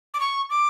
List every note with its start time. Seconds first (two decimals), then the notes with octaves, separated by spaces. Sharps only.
0.14 D6
0.20 C#6
0.50 D6